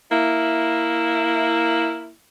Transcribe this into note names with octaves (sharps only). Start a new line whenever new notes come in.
A#3 E4